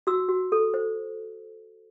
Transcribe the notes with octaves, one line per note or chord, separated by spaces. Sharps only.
F#4 E6
F#4
A4
C5